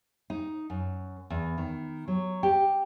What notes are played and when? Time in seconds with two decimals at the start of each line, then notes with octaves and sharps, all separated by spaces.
0.30 D#4
0.70 F#2
1.30 E2
1.58 D#3
2.08 F#3
2.43 G4